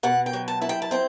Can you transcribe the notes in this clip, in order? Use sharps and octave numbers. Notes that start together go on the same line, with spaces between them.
B2 F#5
G5
F#3
A5
E4 A5
G5
A5
C4 G5